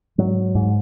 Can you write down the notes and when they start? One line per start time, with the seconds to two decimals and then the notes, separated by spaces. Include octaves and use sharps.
0.18 G#2 F#3
0.55 G#2